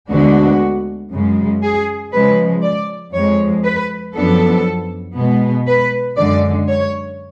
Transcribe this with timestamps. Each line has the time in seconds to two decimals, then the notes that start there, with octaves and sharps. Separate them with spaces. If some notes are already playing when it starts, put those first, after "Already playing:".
0.10 D2 D3 G#3 B3 D4 F#4
1.11 F#2 C#3 G#3
1.62 G#4
2.13 C#3 F3 G#3 B4
2.63 D5
3.13 F2 F3 G#3 C#5
3.64 B4
4.15 F#2 F3 B3 D4 A4
5.15 B2 G#3 B3
5.67 B4
6.17 F#2 D3 G#3 D5
6.68 C#5